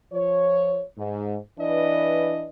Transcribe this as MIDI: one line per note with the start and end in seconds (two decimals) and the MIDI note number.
0.12 0.82 53
0.12 0.82 73
0.98 1.36 44
1.59 2.49 52
1.59 2.49 62
1.59 2.49 71
1.59 2.49 74
1.59 2.49 75